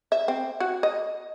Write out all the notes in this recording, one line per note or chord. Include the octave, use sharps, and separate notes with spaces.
E5
C4
F#4
D#5